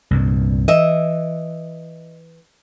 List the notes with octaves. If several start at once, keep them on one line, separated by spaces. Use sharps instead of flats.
C2 G2 A#2
E3 D#5 E5